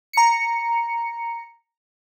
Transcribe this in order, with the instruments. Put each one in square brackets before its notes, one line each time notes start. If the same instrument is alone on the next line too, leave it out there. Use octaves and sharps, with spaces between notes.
[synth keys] A#5 C#7